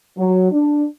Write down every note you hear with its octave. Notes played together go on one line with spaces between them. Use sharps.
F#3
D4